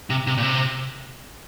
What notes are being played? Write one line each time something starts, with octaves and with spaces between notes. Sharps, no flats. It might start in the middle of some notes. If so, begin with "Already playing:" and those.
C3
C3
A#2
C3